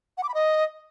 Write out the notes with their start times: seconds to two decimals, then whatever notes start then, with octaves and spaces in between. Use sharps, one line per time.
0.18 F#5
0.23 D6
0.29 B5
0.34 D#5